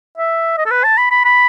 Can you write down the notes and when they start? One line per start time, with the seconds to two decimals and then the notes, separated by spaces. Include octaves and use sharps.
0.18 E5
0.57 D#5
0.66 A4
0.71 B4
0.84 A5
0.98 B5
1.11 B5
1.25 B5